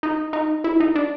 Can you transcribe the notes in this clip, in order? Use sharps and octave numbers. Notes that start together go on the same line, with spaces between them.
D#4
D#4
E4
D#4
D4